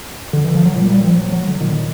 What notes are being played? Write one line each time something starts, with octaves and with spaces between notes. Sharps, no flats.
D3
E3
F3
F#3
A#2 G3
G3
F3
F#3
F#3
D3
A#2 D#3